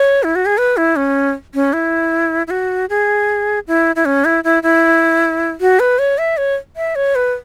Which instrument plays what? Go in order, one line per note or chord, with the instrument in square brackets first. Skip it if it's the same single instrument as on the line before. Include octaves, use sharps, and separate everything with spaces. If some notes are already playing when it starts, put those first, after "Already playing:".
Already playing: [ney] C#5
E4
F#4
G#4
B4
E4
C#4
C#4
E4
E4
F#4
G#4
E4
E4
C#4
E4
E4
E4
F#4
B4
C#5
E5
C#5
E5
C#5
B4